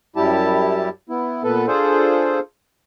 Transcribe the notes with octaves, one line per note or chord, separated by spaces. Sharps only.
F#2 G3 E4 G4 A5
B3 E4
A#2 B3 A4 B4
D4 F4 G#4 A4 C5